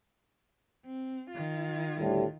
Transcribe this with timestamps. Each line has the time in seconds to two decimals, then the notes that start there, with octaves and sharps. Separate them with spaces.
0.86 C4
1.31 D#3 F4
1.98 D2 A2 G3